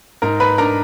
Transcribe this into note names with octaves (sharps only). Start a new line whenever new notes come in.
G#2 A#4 A#5
B4 B5
D4 A#4 A#5